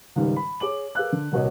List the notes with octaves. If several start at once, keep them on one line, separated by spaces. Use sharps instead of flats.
C#2 G#2 D#3 G3
B5
G#4 C#5 D6 F#7
G#4 A#4 B4 F5 E6 F#6
D3
D#1 C2 F#4 C#5 D#5